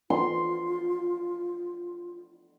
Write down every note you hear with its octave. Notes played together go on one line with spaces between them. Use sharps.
F4 C6